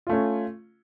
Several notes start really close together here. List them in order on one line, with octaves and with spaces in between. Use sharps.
F4 A3 C#4